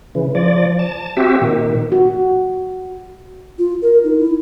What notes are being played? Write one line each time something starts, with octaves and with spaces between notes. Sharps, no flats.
C#3 E3
F3 D5
A5
C4 F#4 G4 E5
A#2 D#3
F#4
F4
A#4
D#4
E4